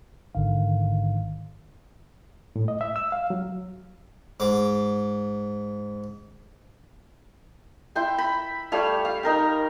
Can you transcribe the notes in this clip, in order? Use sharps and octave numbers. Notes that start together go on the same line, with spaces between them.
A1 G#2 D3 D#3 F5
A2
D#5
E5
E6
F5
F#3
G#2 D6
E4 G5 C6
B5
G3 A3 C#5 F5
F5
D#4 A#4 G5